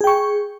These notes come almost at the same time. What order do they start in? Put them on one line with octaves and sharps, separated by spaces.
G#4 G5 C#6